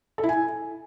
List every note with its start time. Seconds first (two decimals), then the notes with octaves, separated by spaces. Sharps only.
0.18 A4
0.24 E4
0.29 G#5